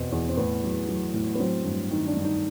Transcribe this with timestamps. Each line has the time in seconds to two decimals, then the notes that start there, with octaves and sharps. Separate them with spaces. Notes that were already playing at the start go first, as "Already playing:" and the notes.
Already playing: E2 B2 B3 C4
0.12 E2
0.29 C4
0.37 A2 B3
0.63 F#3
0.88 F#3
1.14 A2
1.35 B3
1.40 F#3 C4
1.65 G2
1.91 D#3
2.07 D4
2.17 G2
2.25 D#4